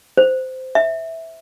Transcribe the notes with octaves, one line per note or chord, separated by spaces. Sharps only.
C5
E5